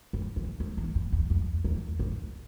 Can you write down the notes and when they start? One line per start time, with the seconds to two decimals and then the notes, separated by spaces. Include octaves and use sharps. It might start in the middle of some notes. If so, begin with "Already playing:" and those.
0.13 F2
0.36 E2
0.60 F2
0.77 E2
0.95 F2
1.12 E2
1.30 F2
1.64 E2
1.99 F2